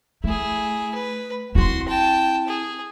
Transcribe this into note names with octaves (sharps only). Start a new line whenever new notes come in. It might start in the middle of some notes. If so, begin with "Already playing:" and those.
A3 E4 G#4
B4
C4 E4 F#4 C6
G5 A5
G#4